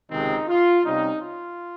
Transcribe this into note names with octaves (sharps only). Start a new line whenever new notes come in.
C#2 C3 D#3 G#3 C4 D#4
F4
C3 G3 C#4 D#4
F4